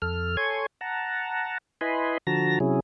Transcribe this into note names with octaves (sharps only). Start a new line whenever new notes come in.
F2 A4 F6
A4 C#5 G#5 C6 C#6 G#6
F#5 A5 A#5
E4 B4 D#5 G#5 B5 C6
D3 F3 F#4 A5 A#5 A#6
C3 F#3 C#4 E4 G#4